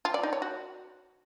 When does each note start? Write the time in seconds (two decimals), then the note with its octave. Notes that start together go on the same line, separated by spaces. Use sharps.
0.05 F4
0.14 D5
0.23 D#4
0.33 C#5
0.42 F#4